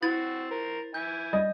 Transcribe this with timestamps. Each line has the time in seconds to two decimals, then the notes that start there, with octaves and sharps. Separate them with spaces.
0.03 C4 E4 F#4 A6
0.51 A#4 C5
0.94 E4 G#5 G6
1.33 G3 D#5